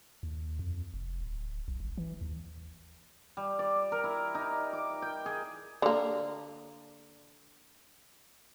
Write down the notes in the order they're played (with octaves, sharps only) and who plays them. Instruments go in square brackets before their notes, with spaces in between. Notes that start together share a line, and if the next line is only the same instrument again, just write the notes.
[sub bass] D#2
F2
F1
D1
B1
G1
E3
D#2
[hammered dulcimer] G3
D5
A#4
E4
D#4
D6
G5
G#4
[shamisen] D3 A#3